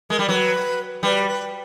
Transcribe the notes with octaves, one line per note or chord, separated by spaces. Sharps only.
G#3 A#4
G3
F#3 B4
G3 B4
B4